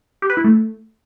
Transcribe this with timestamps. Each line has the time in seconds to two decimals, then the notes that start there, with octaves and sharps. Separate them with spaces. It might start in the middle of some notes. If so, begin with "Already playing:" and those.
0.22 G4
0.30 B4
0.37 E4
0.44 A3